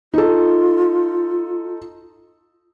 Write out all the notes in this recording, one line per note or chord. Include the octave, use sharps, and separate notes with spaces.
D#4 F4 A4